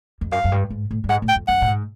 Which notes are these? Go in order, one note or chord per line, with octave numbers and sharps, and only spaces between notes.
F2
F#2 F5
F#2
G2
G#2
A2
G2
G#2 F#5
A2
G5
F2
F#2 F#5
A2
G#2